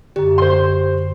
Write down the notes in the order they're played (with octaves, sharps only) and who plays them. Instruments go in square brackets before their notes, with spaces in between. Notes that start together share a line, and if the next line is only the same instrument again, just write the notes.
[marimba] F#2 D3 [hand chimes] G4
[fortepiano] C5 C6